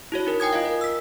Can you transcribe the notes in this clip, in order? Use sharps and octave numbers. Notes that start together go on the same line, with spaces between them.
E4 F#4 C#5
D#4 A#4
G5 G#5 D#6 G#6
F4 D#5 F5
A#4
E6 B6